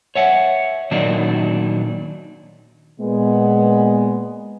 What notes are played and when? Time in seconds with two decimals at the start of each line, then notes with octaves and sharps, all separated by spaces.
0.15 C#5 E5 F#5
0.91 A#2 D#3 F#3 D4 D#4
2.99 A#2 G#3 B3